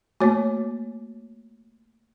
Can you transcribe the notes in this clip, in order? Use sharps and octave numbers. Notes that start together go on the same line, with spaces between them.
A3 A#3 F#4 C#5